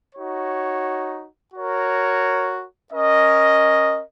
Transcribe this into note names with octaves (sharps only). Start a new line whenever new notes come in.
D#4 F#4 C#5
F#4 A#4 C#5
C#4 A#4 D#5